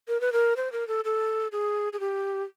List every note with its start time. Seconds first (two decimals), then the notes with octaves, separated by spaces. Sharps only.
0.08 A#4
0.21 B4
0.32 A#4
0.57 C5
0.72 A#4
0.88 A4
1.05 A4
1.52 G#4
1.93 G#4
2.00 G4